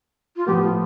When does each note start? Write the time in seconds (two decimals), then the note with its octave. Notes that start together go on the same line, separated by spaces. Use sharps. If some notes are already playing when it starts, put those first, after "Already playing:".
0.36 F4
0.47 A2 F3 B3 G4
0.63 F4